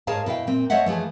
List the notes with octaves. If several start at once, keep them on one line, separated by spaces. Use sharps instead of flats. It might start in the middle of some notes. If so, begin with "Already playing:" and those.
G#2 G#4 A#4 C#5 F5 A5
B2 E4 F5 G5
A#2 C4
A3 C5 C#5 D#5 E5 F#5
E3 F3 A3 G#4